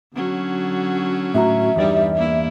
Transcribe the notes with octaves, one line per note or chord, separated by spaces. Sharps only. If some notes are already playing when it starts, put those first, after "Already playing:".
D3 F#3 C#4
A2 F#4 E5 A#5
E2 G2 G3 D#4 D5
A#3 E4